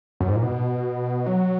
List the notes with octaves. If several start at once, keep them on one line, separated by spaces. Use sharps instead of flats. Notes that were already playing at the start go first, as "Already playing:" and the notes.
F#2
G#2
A#2
B2
F#3